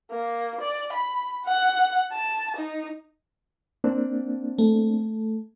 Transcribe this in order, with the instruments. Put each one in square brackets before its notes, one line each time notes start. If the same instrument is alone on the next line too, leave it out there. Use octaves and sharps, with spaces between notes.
[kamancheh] A#3
D5
B5
F#5
A5
D#4
[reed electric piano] A#3 C4 D4
[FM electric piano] A3